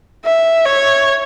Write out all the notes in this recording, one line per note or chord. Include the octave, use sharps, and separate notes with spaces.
E5
C#5